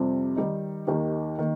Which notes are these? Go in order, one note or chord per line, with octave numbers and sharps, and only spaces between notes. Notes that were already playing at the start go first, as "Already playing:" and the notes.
Already playing: F2 C3 G3
D#3 G3 D#4
D#2 D#3 A#3 D#4 G4
D#3 A#3